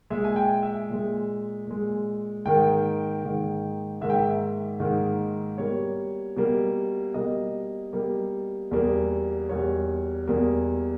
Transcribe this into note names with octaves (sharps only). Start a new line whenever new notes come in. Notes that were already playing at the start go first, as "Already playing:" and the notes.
A#2 G#3 E5
G#5
G5
E5
A#2 G#3
A#2 G#3
G#2 D#3 A#3 G5
G#2 D#3 A#3
G#2 D#3 A#3 E5
G5
E5
G#2 D#3 A#3
B2 G3 A#3 C#5
B2 G3 A#3
B2 G3 A#3 D#5
B2 G3 A#3
E2 B2 G3 A#3
E2 B2 G3 A#3 C#5
E2 B2 G3 A#3